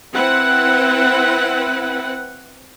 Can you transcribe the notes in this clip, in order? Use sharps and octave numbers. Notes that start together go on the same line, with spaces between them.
C4 E4 B4 F#5